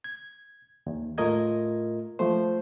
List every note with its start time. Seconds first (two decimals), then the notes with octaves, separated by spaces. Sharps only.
0.04 G#6
0.87 D#2
1.18 A2 A3 F4 A#4 D#5 G#6
2.19 F3 A3 C5